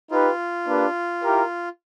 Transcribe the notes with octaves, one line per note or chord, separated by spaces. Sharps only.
D#4 F4 G4 B4
A#3 D4 G4 B4
E4 G4 A#4